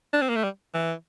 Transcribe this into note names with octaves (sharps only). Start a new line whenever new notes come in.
D4
C4
A#3
A3
G3
E3